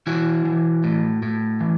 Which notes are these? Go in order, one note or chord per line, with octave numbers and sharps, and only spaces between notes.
E3 E4 F#4
E3
A2
A2
E3